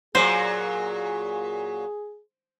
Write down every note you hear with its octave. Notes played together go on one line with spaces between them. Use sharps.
A#2 F#3 G#4 C5